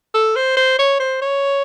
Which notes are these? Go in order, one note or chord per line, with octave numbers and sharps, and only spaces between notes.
A4
C5
C5
C#5
C5
C#5